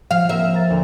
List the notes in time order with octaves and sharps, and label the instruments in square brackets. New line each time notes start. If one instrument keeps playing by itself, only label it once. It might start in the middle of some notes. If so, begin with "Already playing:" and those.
[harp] F3 [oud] F5
[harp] A#3 C4 A#4 [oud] E5
[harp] A#5 A6
D2